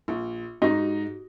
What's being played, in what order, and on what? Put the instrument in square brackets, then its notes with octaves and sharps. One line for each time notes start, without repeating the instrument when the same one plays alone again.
[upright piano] A#1
[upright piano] G#2 [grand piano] D#4 [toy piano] F#4 G4